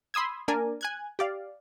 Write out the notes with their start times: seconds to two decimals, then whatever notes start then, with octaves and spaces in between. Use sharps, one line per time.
0.14 B5 C6 D#6 E6 G#6
0.48 A#3 D4 A#4 D5 G#5
0.81 G#5 F#6 G#6
1.19 G4 D5 F5